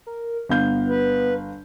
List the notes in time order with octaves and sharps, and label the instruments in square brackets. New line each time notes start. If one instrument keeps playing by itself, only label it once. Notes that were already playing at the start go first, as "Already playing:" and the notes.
[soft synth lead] A#4
[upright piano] G1 F5 G6 [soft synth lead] B3
[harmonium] B4